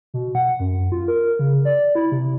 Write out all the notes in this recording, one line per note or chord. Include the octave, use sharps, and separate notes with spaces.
B2
F#5
F#2
F4
A#4
C#3
D5
E4
C3